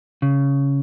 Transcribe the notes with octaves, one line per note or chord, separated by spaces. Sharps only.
C#3